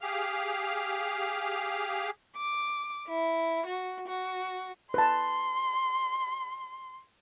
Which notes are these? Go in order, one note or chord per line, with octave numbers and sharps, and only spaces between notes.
G4 G#4 F5 F6
D6
E4
F#4
F#4
B4 A5 C6